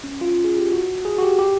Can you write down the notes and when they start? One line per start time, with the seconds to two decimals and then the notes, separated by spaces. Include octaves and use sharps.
0.04 C#4
0.21 F4
0.44 G#4
0.58 G4
0.72 F#4
1.05 G#4
1.18 F#4
1.23 G4
1.39 G4